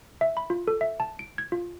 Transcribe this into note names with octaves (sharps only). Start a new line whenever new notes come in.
E5
B5
F4
A4
E5
A5
D7
G#6
F4